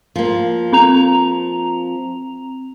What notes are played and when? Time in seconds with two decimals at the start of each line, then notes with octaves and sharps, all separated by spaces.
0.16 F3 A#3
0.73 C4 A#5 F7